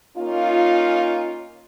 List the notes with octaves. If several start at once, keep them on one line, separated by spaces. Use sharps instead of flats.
A#3 C#4 D#4 F4